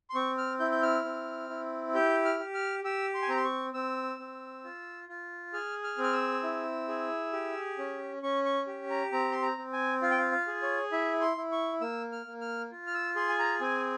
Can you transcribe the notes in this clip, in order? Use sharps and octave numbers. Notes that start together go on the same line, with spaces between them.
C6
C4 C#6
F6
E4 G6
G6
F6
C4
E4
G4 G6
F6
G4
F6
G4 E6
C6
G#5
C4 A#5
C6
C#6
C4 E6
C4
F4
F4
G#4 F6
F6
C4
F6
E6
E4
G#4
G4
C#4
C#4 C#6
C#6
G4
A#5
C4 A#5
C6
A#5
C4
G#5
F4 F5
G5
F5
F5
G#4
C#5
E4 E5
C6
E4
C#6
A#3 E6
F6
A#3
F6
F4
F6
E6
G#4 C6
G#5
A#5
C4 G#5